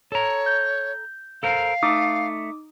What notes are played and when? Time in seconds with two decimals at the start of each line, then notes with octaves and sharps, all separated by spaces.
0.12 A4 C#5 A#5
0.46 G6
1.43 A4 A#4 C5 F5
1.83 A3 D#4 D6 D#6